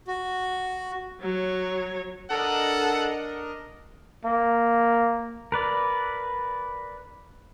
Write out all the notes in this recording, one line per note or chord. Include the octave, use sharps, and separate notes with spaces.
F#4
F#3 C#5
D4 A4 A#4 D#5 F#5
A#3
A#4 B4 D5